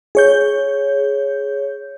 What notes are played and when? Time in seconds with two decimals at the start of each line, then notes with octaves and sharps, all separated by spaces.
0.15 G#4 C#5 G6